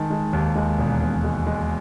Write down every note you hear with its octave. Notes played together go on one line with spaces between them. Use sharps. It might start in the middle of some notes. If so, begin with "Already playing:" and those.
Already playing: D#3 G#3 A5
G#3
D#2
G#3
E1
E1
G#3
G#3